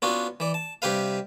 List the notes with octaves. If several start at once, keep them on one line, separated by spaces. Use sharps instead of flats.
B3 C#4 D4 F4 F#4
E3 D5
A5
G2 C3 G4 B4 F5